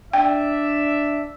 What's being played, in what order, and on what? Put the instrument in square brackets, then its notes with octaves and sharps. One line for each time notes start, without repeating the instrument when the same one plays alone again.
[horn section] D4 D5 E5 [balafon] G5